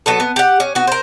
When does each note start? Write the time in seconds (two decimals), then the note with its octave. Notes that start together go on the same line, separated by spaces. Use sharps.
0.06 F#3 B3 A4
0.20 B3
0.36 G4 F#5
0.60 C#4
0.75 B3 F#4
0.87 A#4 C5